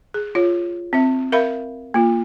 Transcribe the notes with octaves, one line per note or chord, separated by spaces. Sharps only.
G#4
F4 C#5
C4 E5
A#4 E5 F5 B5
A#3 F4